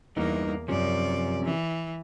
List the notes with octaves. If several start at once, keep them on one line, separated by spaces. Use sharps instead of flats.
E2 G2 E3 A#3 D#4
F#2 C3 F3 C#4 D5
E3